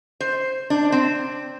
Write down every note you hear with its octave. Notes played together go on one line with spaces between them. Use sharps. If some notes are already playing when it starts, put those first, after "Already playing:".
C5
D4
C4